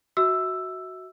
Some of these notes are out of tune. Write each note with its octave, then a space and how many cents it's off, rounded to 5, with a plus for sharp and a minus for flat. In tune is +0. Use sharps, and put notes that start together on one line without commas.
F#4 +5 E5 -25 E6 +5